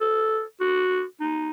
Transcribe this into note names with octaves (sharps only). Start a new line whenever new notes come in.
A4
F#4
D#4